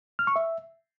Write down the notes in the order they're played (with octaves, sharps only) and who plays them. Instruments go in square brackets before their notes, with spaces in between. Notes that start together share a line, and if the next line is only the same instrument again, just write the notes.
[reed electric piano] F6
C#6
E5